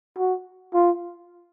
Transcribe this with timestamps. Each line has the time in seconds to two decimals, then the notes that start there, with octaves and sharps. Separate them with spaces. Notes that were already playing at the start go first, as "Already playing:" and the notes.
0.18 F#4
0.74 F4